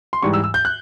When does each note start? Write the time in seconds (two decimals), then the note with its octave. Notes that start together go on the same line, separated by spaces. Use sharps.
0.13 C6
0.22 G#2 E3 G3 C#6
0.34 E6
0.44 E6
0.54 G6
0.65 F#6